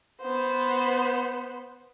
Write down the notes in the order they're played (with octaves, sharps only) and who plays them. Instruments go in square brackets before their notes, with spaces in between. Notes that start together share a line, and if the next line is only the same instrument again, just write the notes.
[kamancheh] B3 C5